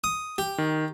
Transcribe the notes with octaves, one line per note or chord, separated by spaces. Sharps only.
D#6
G4
D#3